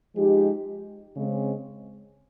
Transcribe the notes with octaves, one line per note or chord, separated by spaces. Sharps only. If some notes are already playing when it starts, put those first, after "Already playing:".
F3 G#3 D#4 G4
C#3 G#3 C4